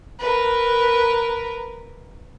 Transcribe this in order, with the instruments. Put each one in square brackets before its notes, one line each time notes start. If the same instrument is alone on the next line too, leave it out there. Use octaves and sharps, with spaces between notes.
[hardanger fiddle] A#4 B4